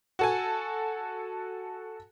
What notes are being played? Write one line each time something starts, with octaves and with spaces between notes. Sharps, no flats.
F#4 A4 G#5